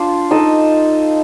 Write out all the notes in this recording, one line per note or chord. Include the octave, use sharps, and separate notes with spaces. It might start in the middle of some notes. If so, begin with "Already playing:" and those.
Already playing: D4 F4 C5
D#4 A4 D#5